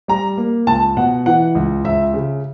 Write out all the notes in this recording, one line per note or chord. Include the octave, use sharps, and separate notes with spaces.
G3 A#5
A#3
C#2 A5
B2 F#5
E3 F#5
C#2
C#2 E5
C#3